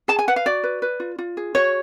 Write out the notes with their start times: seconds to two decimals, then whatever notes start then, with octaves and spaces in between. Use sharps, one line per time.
0.08 G#4 A5
0.19 G#5
0.28 B4 F#5
0.36 F5
0.46 F#4 D5
0.64 B4
0.82 B4
1.00 F4
1.19 F4
1.37 G#4
1.55 F#4 C#5